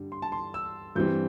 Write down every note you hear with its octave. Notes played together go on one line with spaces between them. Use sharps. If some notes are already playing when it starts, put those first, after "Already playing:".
Already playing: G2 D3 G3
C6
A5
C6
E6
G2 E3 G3 C4 G6